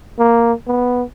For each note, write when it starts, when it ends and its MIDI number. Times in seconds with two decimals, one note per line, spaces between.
0.19 0.53 58
0.67 1.03 59